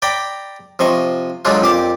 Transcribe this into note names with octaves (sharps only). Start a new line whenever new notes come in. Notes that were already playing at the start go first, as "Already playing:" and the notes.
D5 G5 A#5 B5
C3 F3 D#5 C#6
D3 F#3 G#3 D4 D#4 F4
F2 A#2 G4 D6